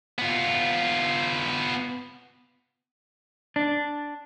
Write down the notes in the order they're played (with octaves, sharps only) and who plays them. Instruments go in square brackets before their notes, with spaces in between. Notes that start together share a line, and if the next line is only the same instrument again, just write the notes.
[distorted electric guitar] B3 F4
[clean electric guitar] D4